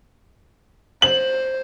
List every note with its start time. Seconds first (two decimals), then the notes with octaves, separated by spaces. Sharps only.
1.02 C5 F#7